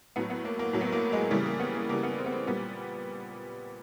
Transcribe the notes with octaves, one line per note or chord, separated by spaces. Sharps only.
A2 F#3 B3
B3
A#3
A#3
A2 F#3
B3
A#3
G#3
C#3 E3 G3 A3
A#3
B3
A#3
C#3 E3 G3 A#3
B3
C4
B3
C4
A#2 G3 B3